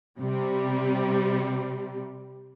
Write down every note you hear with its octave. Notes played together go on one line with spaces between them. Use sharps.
C3 G3